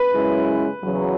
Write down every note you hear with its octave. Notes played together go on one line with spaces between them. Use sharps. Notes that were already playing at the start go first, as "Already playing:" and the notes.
Already playing: B4
F#2 C#3 G#3 C#4 E4
E2 C#3 F#3